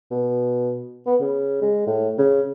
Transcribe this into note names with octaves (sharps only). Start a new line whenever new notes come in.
B2
B3
C#3
G#3
A2
C#3